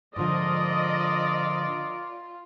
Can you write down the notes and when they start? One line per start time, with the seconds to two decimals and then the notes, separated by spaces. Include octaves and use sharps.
0.16 G#2 D3 F3 F4 A#4 D5 D#5